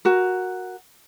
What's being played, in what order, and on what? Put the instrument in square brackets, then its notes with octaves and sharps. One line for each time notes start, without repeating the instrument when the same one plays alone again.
[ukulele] F#4 A#4